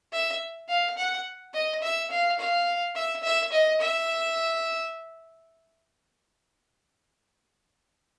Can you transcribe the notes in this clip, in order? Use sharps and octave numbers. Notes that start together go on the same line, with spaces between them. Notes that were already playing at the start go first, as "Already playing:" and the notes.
E5
F5
F#5
D#5
E5
F5
F5
E5
E5
D#5
E5